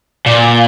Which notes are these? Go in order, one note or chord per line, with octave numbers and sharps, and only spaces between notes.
A#2